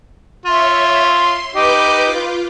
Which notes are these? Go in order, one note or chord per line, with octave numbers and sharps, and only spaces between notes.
F4 C#5 E5
C6
D#4 G4 B4 D6 G6
F4